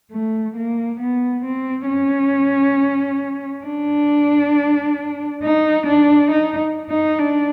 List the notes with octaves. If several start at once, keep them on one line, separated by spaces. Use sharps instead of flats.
A3
A#3
B3
C4
C#4
D4
D#4
D4
D#4
D#4
D4